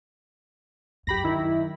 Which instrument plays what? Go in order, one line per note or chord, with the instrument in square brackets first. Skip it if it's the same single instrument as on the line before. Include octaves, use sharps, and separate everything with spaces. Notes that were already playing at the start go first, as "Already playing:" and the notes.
[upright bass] F#2 [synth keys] G4 B5 A#6
[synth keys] D#3 E4